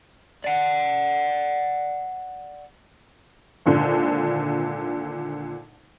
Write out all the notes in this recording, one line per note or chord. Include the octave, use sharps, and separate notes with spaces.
D5 F#5
G#1 A#2 D3